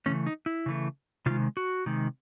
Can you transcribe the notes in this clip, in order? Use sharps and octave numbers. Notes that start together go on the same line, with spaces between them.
C#3 E3 A3 C#4
D#4
E4
C#3 E3 A3
C3 D#3 G#3 F4
F#4
C3 D#3 G#3